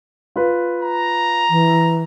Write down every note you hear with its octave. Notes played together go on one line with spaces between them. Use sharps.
F4 B4
A#5
E3